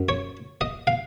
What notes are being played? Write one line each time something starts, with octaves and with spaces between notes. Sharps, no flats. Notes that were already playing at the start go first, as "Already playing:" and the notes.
Already playing: F#2
C#5
D#5
F5